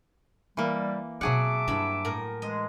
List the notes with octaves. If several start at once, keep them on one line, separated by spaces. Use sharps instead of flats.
E3 G3 A#3
B2 F#3 C4 G#4 E5 F#5 A5 D6
G2 E4 B5
A2 A#4
E3 G#3 D#5